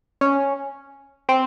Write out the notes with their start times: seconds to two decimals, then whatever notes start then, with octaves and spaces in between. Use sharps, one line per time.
0.21 C#4
1.29 C4